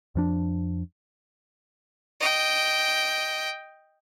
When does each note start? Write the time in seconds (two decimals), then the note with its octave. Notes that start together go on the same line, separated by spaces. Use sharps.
0.15 F2 F3 D4
2.20 D#5 G5